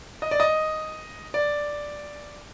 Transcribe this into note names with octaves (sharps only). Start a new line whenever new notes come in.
D#5
D5
D#5
D5